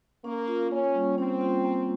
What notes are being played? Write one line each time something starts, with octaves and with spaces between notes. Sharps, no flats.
A#3 C#4
F4
A#3 C#4
G3
C4 C#4
F4
A#3